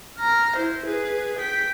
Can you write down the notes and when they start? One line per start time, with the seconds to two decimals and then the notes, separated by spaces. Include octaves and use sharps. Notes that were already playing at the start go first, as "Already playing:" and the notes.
0.18 A#5 F6
0.56 E4 C5
0.85 G#4 B4
1.39 G5 B6